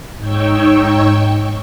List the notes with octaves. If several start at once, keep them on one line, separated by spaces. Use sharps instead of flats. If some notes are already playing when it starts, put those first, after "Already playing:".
G#2 D#4 C#5 G5 C#6 E6